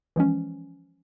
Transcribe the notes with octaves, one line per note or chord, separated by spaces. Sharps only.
E3 F3 G#3 C#4